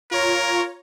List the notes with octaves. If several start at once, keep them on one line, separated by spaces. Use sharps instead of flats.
F4 A#4 C#5 A#5